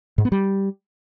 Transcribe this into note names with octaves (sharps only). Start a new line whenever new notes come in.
G#2
B3
G3